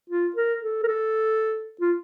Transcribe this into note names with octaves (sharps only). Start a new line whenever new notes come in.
F4
A#4
A4
A#4
A4
F4